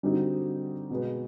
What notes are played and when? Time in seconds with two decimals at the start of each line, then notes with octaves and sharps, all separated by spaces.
0.03 D3 G3 C4 D#4 F#4
0.90 B2 G#3 B3